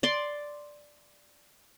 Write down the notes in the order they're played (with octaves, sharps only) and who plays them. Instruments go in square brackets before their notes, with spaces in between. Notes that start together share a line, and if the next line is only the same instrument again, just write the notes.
[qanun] D5 C6